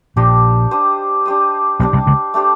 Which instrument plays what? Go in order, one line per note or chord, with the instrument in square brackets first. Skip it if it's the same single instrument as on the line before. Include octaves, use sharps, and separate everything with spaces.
[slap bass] A#1 A#2 [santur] D4 G4 C5 D#5
[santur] D4 G4 C5 D#5
D4 G4 C5 D#5
[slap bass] B1 B2 [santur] D4 G4 C5 D#5
[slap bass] C2 C3
C#2 C#3
[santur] A3 D4 G4 C5